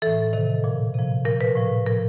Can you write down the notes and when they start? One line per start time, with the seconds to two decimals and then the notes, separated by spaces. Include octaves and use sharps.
0.02 A2 E3 A4
0.33 C3 D#3
0.64 A#2 F3
0.94 C3 F3
1.25 A#2 F3 A#4
1.41 B4
1.56 A2 F3
1.87 A#2 F3 A#4